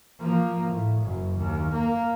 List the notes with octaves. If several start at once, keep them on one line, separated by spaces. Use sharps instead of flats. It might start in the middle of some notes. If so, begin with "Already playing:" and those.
F3 A#3
A2
F#1 F#2
D#2
A#3